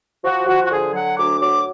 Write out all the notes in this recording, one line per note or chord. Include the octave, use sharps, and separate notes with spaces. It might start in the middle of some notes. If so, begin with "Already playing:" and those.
F3 F#4
F3 F#4
F#4
D3 G#4
F#3 F#5
D2 D6
F#3 D6